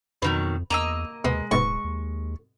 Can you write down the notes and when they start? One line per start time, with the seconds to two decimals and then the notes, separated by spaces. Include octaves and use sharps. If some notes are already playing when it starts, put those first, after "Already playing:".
0.22 F2 B2 D#3 F#3 B4
0.70 E2 A#3 D#5 A#5 E6
1.24 D#2 B2 G#3
1.51 D1 G#2 B2 C#6
1.84 D#2